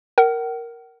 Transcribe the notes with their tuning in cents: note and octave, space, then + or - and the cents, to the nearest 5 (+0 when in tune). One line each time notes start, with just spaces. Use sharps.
A#4 +0 F#5 +45